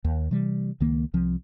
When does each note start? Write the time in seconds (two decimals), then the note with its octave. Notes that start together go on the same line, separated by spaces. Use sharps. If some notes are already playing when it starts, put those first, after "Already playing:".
0.04 D#2
0.31 C3 E3 G3
0.80 C#2 D#3 A#3
1.14 C2 F3 C4